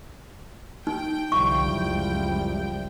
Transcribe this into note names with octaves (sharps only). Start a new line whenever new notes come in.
D#4 G5
C2 D3 F3 G3 E4 C#6
C#2 F#2